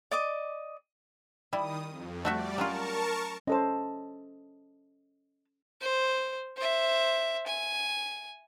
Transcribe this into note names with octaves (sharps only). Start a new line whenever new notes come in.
D5 D#5 D6
D#3 G3 E4 D#6
F2
G3 A3 F#4 D5 E5
F#3 C#4 F4 A#4 A5 C#6
C#4 A4 C5 D#5 A5
C5
C5 E5
G#5